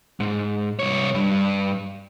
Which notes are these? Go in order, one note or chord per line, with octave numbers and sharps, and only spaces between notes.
G#2
C2 C#5
G2